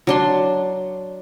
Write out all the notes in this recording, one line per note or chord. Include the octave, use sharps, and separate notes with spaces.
F#3 D4 C6